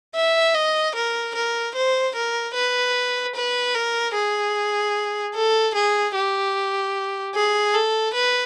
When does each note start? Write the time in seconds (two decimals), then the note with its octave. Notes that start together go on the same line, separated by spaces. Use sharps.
0.15 E5
0.55 D#5
0.95 A#4
1.35 A#4
1.75 C5
2.15 A#4
2.54 B4
3.35 B4
3.75 A#4
4.14 G#4
5.35 A4
5.75 G#4
6.15 G4
7.35 G#4
7.74 A4
8.14 B4